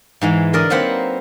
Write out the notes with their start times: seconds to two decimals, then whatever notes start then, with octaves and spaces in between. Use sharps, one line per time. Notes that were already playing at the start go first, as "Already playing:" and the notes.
0.21 G#2 E3 G#3
0.53 D3 A#4 D5 D#5
0.70 F#3 A#3 C4 B4 C5 F#5